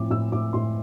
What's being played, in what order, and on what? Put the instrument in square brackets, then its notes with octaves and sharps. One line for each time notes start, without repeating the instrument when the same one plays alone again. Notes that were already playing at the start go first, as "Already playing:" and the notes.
Already playing: [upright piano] A2 F3 C4 D6
A2 E6
A2 D6
A2 C6